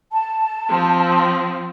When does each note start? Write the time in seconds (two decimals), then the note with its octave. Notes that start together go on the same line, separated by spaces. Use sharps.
0.13 A5
0.69 F3 C4